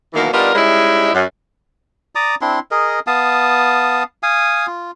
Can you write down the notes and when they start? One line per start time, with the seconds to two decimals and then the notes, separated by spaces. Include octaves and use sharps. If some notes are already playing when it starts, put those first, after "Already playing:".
0.13 B2 D#3 E3 F#3 A#3
0.32 G3 B3 D4 D#4 F4 A#4
0.54 G3 G#3 C#4 D#4 E4
1.13 F#2
2.15 D5 A#5 D6 D#6
2.41 C4 D4 E4 C6
2.71 G#4 A#4 D#5
3.07 B3 F5 A5 D#6
4.23 F5 G#5 D#6
4.67 F4